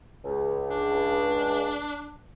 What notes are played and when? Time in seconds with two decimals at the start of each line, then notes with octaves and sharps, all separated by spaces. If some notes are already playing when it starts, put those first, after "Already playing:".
0.25 C#2
0.70 D4